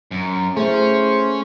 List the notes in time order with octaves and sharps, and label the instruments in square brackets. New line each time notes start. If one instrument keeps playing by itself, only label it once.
[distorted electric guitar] F#2
[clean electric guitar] A3 [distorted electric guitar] C#4 [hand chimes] E4 G#4 [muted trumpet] C5